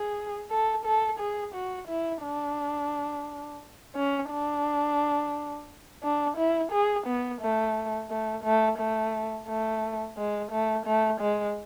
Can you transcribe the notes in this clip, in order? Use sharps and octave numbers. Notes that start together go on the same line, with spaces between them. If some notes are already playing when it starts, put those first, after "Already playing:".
Already playing: G#4
A4
A4
G#4
F#4
E4
D4
C#4
D4
D4
E4
G#4
B3
A3
A3
A3
A3
A3
G#3
A3
A3
G#3